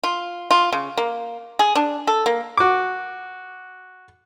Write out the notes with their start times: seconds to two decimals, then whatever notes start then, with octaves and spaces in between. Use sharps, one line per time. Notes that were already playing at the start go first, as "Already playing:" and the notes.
0.03 F4
0.51 F4
0.72 C#3
0.97 A#3
1.59 G#4
1.75 D4
2.07 A4
2.26 A#3
2.57 F#4 D6